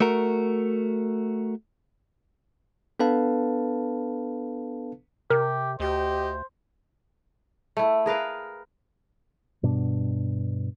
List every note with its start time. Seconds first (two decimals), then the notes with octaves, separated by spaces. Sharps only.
0.01 A3 F#4 A#4
3.00 B3 D4 A4 B4 F5 A5
5.30 C3 G4 A#4
5.80 D2 G4 C5 D#5
7.77 A3 E4
8.06 G#4 A#4 B4 F5
9.63 G2 B2 D4